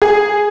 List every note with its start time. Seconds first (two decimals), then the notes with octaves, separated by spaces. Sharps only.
0.02 G#4